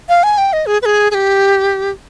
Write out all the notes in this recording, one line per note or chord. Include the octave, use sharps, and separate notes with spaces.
F5
G#5
G5
D#5
G#4
B4
G#4
G#4
G4